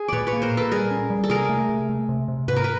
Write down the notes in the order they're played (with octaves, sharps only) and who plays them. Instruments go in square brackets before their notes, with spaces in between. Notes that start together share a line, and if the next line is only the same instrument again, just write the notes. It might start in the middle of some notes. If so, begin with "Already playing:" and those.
Already playing: [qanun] G#4
[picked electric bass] A#2 [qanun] B4 C#5 D5
[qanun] B4 C#5
[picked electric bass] A#3
[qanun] A#4 C5
[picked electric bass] A#2
[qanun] A4 B4
[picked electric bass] G3 [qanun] G#4 A#4
[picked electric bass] C#4
G3
[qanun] A4
[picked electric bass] C3 [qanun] G#4 A#4
[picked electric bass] A3
C3
A3
C3
C3
[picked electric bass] G#2 [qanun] B4
[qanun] A#4
B4